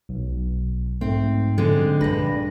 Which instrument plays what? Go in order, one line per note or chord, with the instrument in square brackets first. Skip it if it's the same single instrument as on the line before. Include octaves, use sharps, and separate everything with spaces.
[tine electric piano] B1
[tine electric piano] G#2 A3 [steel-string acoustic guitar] C4
[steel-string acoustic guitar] D3 G#3 C4
[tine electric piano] A#1 D4 A#6 [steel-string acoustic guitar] G2 B4